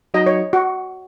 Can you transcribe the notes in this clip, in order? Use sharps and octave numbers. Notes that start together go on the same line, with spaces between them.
F#3 D#4 F#4 D#5
C#5
F#4